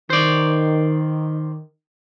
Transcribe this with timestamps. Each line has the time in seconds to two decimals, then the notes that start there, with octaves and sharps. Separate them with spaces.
0.10 D#3 C5 D5